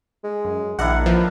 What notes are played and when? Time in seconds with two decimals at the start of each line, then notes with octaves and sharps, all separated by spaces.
0.24 G#3
0.44 F#2
0.79 A#1 D#3 D4 E4 F#5
1.06 E3 F3